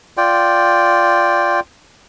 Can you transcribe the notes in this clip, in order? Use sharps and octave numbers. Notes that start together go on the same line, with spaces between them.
F4 D5 G5